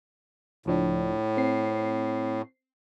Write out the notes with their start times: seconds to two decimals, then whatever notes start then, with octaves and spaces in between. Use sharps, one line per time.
0.66 C#2 A2 F3 D4
1.37 C4 C7